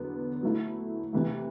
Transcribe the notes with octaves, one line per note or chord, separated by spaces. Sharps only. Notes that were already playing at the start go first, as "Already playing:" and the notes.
Already playing: E2 D3 F#3 B3
F#3 A3 E4
C3 E3 A3